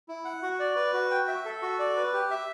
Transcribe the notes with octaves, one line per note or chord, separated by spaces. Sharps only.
E4
F#5
F#4
D5
B4
F#4
G5
E5
A4
F#4
D5
B4
G4
E5